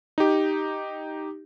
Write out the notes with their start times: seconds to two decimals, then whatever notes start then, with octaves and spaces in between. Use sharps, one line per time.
0.18 D#4 G4